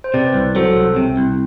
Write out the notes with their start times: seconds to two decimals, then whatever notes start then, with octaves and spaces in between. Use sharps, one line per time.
0.04 C5
0.14 C3 B4 D5
0.34 C2
0.55 F#3 A4 C5
0.76 C2
0.96 C3
1.17 C2